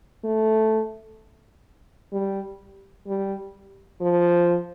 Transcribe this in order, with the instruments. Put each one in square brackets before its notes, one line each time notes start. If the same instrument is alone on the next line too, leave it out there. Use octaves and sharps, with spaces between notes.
[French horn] A3
G3
G3
F3